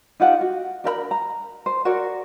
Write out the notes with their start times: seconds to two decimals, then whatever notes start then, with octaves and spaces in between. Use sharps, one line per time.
0.20 D#4 F4 G4 F#5
0.41 F#4
0.84 D4 A#4 E5 B5
1.11 A#5
1.66 C5
1.85 F#4 A#4 C#5 D5